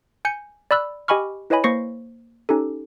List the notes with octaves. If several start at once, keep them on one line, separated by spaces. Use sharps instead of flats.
G#5 G6 C#7
D5 B5 E6 F#6
G4 D#5 G#5 B5 C#6 F6
E4 B4 C#5 D#5 G#5 B5
A#3 C5 C#6 A#6 C7 C#7
C#4 D#4 G4 A4